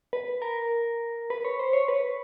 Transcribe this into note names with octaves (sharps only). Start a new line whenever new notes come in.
B4
A#4
B4
C#5
C5
C#5
B4